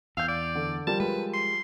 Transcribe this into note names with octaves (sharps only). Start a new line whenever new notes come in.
E2 F5 E6 G6
D5
D3
F3 G3 A#4 A5
G#3 B4
C6